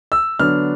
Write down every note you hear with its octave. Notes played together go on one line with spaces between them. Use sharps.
E6
D3 F#3 B3 D4 F6